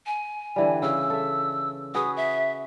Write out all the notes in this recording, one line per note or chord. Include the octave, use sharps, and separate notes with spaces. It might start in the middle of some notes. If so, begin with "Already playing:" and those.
G#5
D3 E3 G3
C#3 E6
A4 E5
F#4 G#4 B4 D#6
E5